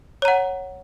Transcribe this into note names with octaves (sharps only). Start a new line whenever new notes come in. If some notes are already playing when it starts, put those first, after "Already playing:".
C#5 F#5 A#5